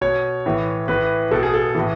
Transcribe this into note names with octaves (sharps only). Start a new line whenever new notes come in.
B2 C#5
A2 E3
A2 E3 B4
B2 A4
G#4
A4
A2 E3